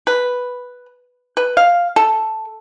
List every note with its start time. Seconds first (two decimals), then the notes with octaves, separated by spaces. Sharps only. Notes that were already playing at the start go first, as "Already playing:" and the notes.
0.07 B4
1.37 B4
1.57 F5
1.96 A4